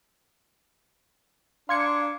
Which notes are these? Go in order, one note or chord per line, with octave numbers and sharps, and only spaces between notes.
D4 F5 A#5 C6 D6 G#6 C#7